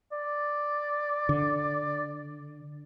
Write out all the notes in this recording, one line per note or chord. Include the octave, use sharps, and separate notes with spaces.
D5
D3